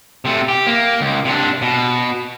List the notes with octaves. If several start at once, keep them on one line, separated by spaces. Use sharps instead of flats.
C3 A3
G4
A#3
C#2
C3 D4
B2